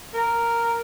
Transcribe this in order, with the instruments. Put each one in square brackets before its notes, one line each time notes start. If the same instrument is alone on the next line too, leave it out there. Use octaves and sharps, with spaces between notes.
[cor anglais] A#4